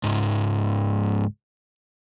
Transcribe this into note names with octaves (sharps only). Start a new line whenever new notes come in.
C#2 G#2